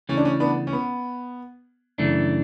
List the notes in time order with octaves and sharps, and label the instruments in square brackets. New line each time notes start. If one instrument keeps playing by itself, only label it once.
[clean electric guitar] C#3 E3 A3 [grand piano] C#4
[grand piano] D4
C#4
B3 D4
C#4
B3
[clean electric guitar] F#2 C#3 E3 A3 D4